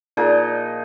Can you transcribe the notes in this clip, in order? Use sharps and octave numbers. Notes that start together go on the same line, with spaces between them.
A#2 F3 D#4 G#4